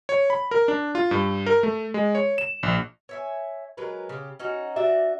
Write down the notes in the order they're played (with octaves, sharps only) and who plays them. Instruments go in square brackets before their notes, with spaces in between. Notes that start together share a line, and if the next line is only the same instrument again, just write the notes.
[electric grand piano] C#5
B5
A#4
D4
F4
G2
A#4
A3
G#3
C#5
E7
A#1
[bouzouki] C#5 E5 G#5
F#3 G#3 A#4 B4
C#3 G4
C#4 D#4 F#4
D4 F#4 D5 E5